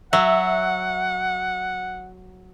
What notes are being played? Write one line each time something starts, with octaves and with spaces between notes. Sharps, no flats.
F#3 E5 F#5